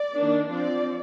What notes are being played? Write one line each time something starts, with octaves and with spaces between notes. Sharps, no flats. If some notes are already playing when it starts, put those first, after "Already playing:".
Already playing: D5
D#3 A#3 D4
F3 C4 D5